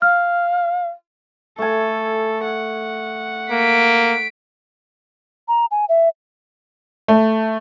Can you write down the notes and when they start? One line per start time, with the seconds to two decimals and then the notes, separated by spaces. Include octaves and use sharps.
0.02 F5 F6
1.58 A3 A4 G#5
2.44 F#5
3.52 A#3 B6 D7
5.48 A#5
5.71 G#5
5.89 E5
7.08 A3